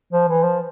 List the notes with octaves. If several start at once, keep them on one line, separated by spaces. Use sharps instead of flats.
F3
E3
F3